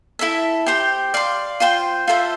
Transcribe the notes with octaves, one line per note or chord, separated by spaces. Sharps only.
E4 A4 E5
G4 C5 G5
D5 F5 C6
F4 C5 G5 C6
F4 A4 C5 E5